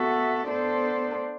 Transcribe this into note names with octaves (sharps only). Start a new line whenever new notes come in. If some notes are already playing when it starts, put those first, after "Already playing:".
Already playing: B3 F#4 A4 E5
B3 D4 A4 C5